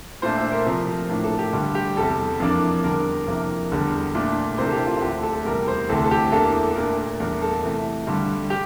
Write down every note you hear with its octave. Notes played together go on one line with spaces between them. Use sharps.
A#2 A3 D4 C5
E5
A#4
C3 F3 A3 C4 A#4
A2 E3 A#3 D4
A4
G4
G2 D3 G3
G4
E2 C3 G3 A4
F2 E3 A#3 D4
E2 D3 G3 D4 A#4
F2 C3 E3 A#3 D4
E2 D3 G3 D4
A#2 A3 D4
C3 E3 A#3 D4 C5
A4
G4
F4
F4
D2 D3 A3 D4 G4
A4
A4
E2 C3 G3 A#4
C5
D2 C3 E3 A4
A4
G4
E2 E3 A#3 D4 A4
A4
A#2 A3 D4 A#4
A#4
E2 E3 G3 D4 A#4
A4
C3 E3 A3
G2 D3 G3
G4